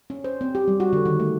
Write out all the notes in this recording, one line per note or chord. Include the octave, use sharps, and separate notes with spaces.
C#4
C5
C4
G4
G3
F#4
D3
D#3
A3